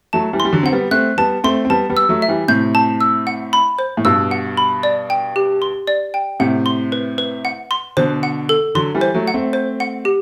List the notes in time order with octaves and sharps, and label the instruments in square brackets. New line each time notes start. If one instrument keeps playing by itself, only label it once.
[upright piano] F#3 A3 [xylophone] A5
[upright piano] E3 G3
[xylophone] C6
[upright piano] G3
D3 F#3
[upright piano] C4 [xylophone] F#5
[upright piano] G3 B3
[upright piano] A3 C4 [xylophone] F#6
[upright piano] G3 B3 [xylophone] A5
[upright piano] A3 C4 [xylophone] C6
[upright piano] C4
[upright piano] G3 B3 [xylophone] A5
[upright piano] G3 B3
[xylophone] E6
[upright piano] F#3 A3
[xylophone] E5
[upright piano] E3 G3
[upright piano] A2 C3 [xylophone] G6
[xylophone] A5
E6
F#5
B5
C5
[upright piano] A2
[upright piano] G2 B2 [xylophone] E6
[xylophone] F#5
B5
D5
G5
G4
C6
D5
G5
[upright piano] A2 C3 [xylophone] F#5
[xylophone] C6
B4
B4
F#5
C6
[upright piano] B2 D3 [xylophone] C5
[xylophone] F#5
A4
[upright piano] D3 F#3 [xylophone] C6
[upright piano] E3 G3
[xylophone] C5
[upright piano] F#3 A3
[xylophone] F#5
[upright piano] A3 C4
[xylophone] C5
F#5
G4